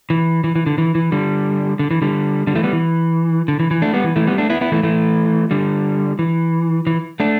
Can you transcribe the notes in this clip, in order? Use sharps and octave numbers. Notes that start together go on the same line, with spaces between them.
E3
E3
E3
D3
E3
E3
D3 G3
D3
E3
D3 G3
D3 G3
E3 A3
G3 B3
E3
D3
E3
E3
A3 D4
G3 B3
E3
E3 A3
G3 B3
A3 D4
B3 E4
B3 E4
E3 A3
E3 A3
D3 G3
E3
E3
A3 D4